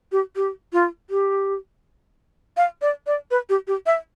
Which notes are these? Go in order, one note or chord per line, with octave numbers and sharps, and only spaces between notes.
G4
G4
F4
G4
F5
D5
D5
B4
G4
G4
E5